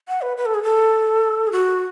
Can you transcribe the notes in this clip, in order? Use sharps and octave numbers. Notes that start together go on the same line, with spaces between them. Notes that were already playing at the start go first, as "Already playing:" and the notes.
F#5
B4
B4
A4
G#4
A4
G#4
F#4